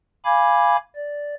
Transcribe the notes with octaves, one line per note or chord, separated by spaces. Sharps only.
F5 G#5 B5 D6 G#6
D5